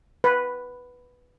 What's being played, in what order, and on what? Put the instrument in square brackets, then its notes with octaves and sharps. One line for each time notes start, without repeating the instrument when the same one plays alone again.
[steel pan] B4